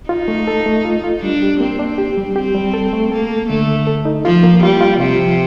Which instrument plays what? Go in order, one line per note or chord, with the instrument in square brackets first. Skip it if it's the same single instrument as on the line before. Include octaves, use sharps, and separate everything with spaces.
[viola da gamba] D#4 [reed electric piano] F4
[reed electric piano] A3
A4
A3
F4
F4
[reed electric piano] G3 [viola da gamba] D4
[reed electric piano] G4
[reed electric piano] A#3 [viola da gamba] C4
[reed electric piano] D4
G4
G3
[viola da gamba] C4 [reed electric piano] G4
[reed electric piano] G3
A4
A3
[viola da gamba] A#3 [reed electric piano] A4
[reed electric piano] A4
[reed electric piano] D3 [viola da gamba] A3
[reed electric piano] D3
A4
D#4
[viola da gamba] F3 [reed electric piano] F4
[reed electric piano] A#3
[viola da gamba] G3 [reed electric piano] F4
[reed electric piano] F4
[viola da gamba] C3 [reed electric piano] F4
[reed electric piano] F3